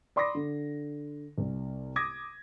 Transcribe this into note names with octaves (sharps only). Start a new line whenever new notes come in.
D5 B5 C6 D6 D#6 A#6
D3
C2
D6 D#6 G#6 A#6